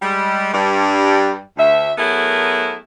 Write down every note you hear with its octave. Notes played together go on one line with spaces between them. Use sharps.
G3 G#3
G2 G3
D2 E5
F#3 A3 B3 E4 G#4 A#4